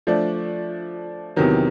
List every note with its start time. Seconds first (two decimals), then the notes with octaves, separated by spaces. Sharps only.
0.07 F3 A3 D4
1.36 E2 C3 D#3 F#3